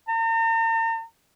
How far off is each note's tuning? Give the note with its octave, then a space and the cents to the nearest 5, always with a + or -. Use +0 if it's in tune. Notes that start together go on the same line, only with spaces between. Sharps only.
A#5 -45